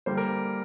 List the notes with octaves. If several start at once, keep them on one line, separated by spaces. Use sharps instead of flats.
D3 G3 A#3 C5
A#4